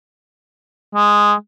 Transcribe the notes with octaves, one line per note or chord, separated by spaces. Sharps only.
G#3